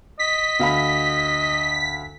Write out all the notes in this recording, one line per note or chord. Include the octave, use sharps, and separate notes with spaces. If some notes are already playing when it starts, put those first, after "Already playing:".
D#5 B6
D2 F5 B5